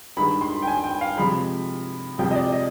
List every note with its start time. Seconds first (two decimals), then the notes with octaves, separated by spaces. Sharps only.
0.17 G2 D#3 G#3 B5
0.41 C6
0.62 G5
0.67 G#5
0.84 G5
1.01 F5
1.17 C3 F3 G#3 B5
2.18 F2 C3 F3 G#3 G5
2.31 D#5
2.35 D5
2.52 D#5